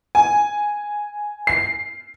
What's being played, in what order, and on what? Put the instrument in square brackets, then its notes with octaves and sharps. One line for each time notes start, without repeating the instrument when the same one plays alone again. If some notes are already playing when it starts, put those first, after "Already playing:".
[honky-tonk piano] G#5
C7